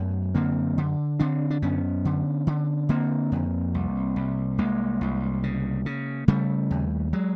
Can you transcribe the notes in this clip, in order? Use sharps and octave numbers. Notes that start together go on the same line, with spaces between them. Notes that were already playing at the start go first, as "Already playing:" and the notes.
Already playing: F#2 A3 B3
D3 A#3 C4
D3
D3 C4 D4
D4
F#2 B3 C#4
D3
D3
D3 A#3 C4
F2
C2
C2
C2 G#3 A#3
C2
C#3
C#3
C#3 G3 A3
D#2
F#3 G#3